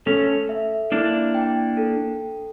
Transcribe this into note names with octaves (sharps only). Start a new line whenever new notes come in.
A3 C#4 A4
E5
A#3 D4 E4
G5
A4